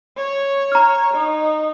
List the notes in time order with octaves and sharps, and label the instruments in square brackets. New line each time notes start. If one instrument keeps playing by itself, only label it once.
[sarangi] C#5
[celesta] A#5 F6
[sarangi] D#4